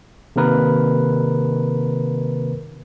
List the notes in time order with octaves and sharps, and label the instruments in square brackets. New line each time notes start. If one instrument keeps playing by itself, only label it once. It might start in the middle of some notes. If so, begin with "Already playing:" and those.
[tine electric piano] C3 D#3 A#3 A#4 B4